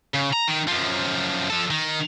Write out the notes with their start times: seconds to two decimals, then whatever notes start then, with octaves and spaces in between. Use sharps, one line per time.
0.15 C#3
0.33 A#5
0.48 D#3
0.68 F#2 F3
1.50 F3 A4
1.70 D#3